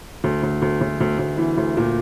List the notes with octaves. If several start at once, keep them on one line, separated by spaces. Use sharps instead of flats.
D2
D2
D2
D2
D2
D2
E3
D2
A#2